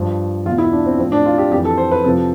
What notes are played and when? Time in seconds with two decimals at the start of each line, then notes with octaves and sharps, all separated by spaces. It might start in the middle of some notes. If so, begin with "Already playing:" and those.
Already playing: G2 F3
0.46 E2 F4
0.50 B2
0.58 E4
0.73 D4
0.86 C4
0.98 F3 C4
1.02 A2
1.12 D4
1.26 F4
1.38 G4
1.51 F2 G4
1.56 E3
1.65 A4
1.78 C5
1.92 B4
2.04 F2 C3 F3 A4